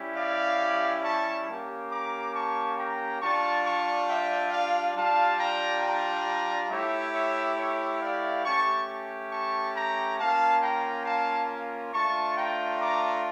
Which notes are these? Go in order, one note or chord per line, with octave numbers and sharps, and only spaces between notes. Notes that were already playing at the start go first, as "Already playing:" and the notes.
Already playing: G3 C#4 E4 G4
D5 F5
A5 C#6
A#3 C#4 G4
A#5 D6
A5 C#6
G5 A#5
G3 D4 F4 A5 C#6
A5 C#6
E5 G5
D5 F5
G3 D4 F4 F5 A5
G5 A#5
G5 A#5
A3 E4 G4 C#5 E5
C#5 E5
C#5 E5
D5 F5
A3 C#4 G4 A5 C#6
A5 C#6
G5 A#5
A#3 C#4 F4 F5 A5
G5 A#5
F5 A5
A3 D4 F4 A5 C#6
G5 A#5
A#5 D6